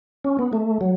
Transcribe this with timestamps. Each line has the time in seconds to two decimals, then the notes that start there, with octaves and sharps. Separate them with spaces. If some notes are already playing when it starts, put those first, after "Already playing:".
0.24 C#4
0.39 B3
0.53 A3
0.81 F#3